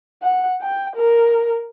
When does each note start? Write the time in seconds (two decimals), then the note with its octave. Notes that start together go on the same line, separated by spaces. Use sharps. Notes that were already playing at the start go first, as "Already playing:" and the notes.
0.23 F#5
0.62 G5
0.96 A#4